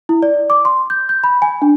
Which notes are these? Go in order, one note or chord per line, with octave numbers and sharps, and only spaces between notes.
E4
D5
D6
C6
G6
G6
B5
G#5
D4